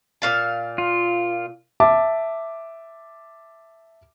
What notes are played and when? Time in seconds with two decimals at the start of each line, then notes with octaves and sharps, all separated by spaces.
0.22 A#2 F5 A5
0.78 F4
1.80 E5 A5 D6